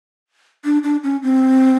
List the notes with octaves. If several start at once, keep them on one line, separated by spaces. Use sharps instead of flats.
D4
D4
C#4
C4